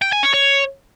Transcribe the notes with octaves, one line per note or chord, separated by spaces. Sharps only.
G5
G#5
C#5
C#5